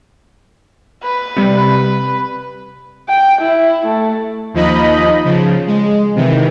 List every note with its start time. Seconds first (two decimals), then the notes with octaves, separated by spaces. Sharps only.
1.03 B4
1.37 C3 G3
3.09 G5
3.41 E4
3.86 A3
4.54 D#2 F3 D#4 D#5 B5
5.24 C#3 F3
5.67 G#3
6.15 C3 D#3 E3